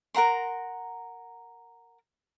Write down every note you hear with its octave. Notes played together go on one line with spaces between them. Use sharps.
A#4 F#5 A#5 C6